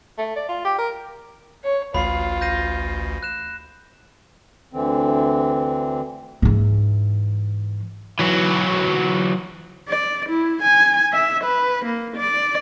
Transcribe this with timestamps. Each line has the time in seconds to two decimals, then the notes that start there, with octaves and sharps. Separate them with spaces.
0.18 A3
0.36 D5
0.49 F4
0.65 G4
0.78 A#4
1.64 C#5
1.94 A1 D2 F4 B5 C7
2.41 G6 A#6 D#7
3.23 F#6 E7
4.73 D2 D3 E3 C4
6.42 G#2 E3
8.19 E3 F#3
9.89 D5
10.29 E4
10.62 G#5
11.13 E5
11.44 B4
11.85 A#3
12.16 D5